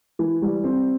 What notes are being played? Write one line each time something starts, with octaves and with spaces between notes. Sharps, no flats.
E3
G3
C4